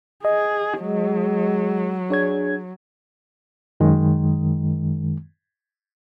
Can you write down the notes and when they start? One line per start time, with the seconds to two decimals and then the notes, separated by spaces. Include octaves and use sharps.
0.25 G#4 D#5
0.80 F#3 G#3
2.10 D4 G#4 C#5 G#6
3.80 F#2 D#3 G#3